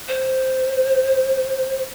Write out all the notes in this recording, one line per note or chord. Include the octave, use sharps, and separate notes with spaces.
C5